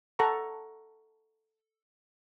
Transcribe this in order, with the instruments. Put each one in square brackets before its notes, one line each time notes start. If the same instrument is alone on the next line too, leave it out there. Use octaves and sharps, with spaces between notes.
[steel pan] A4 F#5 A5 A#5 C#6